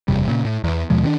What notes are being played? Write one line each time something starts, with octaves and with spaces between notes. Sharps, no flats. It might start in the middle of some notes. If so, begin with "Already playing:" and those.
F#1 E2 C3 G3
A#2 C#3
A2
E2 E3
D#2 B2 F3 G#3
D#3 C4 D4